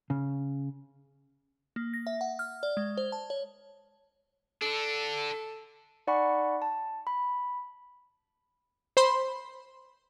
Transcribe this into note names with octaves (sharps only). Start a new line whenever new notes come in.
C#3
A#3
A#6
E5
F#5
F6
D5
G#3
C5
A5
C#5
D3 D4 A4
D#4 D5 F#5 G#5 B5 C#6
A5
B5
C5 B5 C6